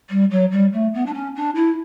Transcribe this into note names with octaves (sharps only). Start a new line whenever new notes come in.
G3
F#3
G3
A3
B3
D4
C#4
D4
E4